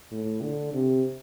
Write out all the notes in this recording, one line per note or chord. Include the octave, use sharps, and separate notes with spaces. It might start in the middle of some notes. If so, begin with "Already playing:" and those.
A2
D3
C3